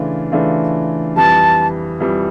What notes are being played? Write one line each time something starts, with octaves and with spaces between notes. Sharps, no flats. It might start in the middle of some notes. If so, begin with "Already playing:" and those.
Already playing: C#3 E3 A3 D4 F4
C#3 E3 A3 D4 F4
F2 E3 G3 A5
F2 E3 G3